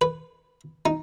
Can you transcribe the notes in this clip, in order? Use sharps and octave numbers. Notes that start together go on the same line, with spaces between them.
B4
D#4